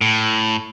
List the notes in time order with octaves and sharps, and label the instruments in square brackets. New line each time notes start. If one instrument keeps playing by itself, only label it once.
[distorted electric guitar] A2